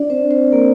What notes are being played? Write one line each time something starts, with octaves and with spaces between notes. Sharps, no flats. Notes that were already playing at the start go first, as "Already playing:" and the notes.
Already playing: D4 D5
C4 C5
C4 C5
A#3 A#4